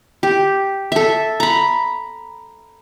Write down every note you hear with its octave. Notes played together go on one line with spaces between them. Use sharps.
G4
A4 E5
A#5 B5